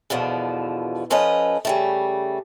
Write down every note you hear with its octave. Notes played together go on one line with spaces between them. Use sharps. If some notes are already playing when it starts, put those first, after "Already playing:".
E2 B2 D3 F3
F3 C#4 A4 B4 D#5
C#3 G3 A3